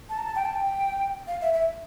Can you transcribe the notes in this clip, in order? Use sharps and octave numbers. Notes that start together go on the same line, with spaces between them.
A5
A#5
A5
G5
A5
G5
F5
E5
E5